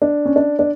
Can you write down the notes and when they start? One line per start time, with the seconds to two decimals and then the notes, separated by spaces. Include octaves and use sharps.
0.02 D4
0.25 C#4
0.36 D4
0.59 D4